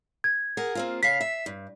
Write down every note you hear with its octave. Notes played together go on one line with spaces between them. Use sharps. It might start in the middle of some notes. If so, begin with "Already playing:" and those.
G#6
G#4 A#4 F#5
A#3 C4 F4
C#3 F5 B6 C7
E5
G2